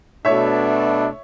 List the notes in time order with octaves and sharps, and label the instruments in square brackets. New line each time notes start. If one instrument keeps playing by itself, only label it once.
[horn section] B2 A3 D4 [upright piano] C#5 E5